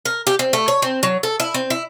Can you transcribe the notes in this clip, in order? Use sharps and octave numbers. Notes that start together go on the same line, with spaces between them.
A#4
G4
C4
A3
C#5
C4
F#3
A4
E4
C4
E4